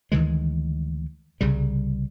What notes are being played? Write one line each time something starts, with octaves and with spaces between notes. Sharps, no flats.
D2 D#3 E3 G#3
C2 C#3 G3